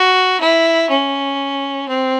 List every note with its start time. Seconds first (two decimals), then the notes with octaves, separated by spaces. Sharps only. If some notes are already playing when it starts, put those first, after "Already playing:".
Already playing: F#4
0.41 E4
0.90 C#4
1.88 C4